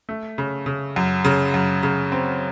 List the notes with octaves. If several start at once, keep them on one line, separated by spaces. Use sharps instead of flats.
A3
C#3
C#3
F#2
C#3
F#2
C#3
C4